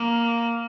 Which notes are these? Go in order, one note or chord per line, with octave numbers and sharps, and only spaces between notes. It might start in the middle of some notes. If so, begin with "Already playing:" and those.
Already playing: A#3